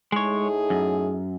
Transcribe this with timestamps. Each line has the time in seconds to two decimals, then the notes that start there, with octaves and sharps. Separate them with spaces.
0.12 A2 G#3 D#4 G#4 C#5
0.70 F#2